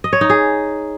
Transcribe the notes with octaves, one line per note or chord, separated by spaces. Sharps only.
D#5
C#5
D#4
G#4